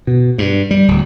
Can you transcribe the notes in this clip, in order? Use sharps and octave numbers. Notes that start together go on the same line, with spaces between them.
B2
G2
G3
D1